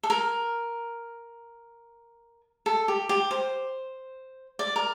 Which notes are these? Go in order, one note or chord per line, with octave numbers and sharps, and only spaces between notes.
A4
A#4
A4
G4
G4
C5
D5
A#4